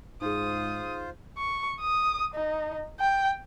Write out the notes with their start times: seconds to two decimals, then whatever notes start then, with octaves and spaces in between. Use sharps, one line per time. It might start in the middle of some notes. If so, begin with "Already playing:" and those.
0.22 G#2 D#4 F4 G#4 C5 D#6
1.37 C#6
1.80 D#6
2.34 D#4
3.00 G5